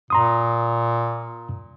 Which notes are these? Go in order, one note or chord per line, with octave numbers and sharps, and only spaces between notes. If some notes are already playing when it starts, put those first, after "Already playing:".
A#2 A#5 C6 D#6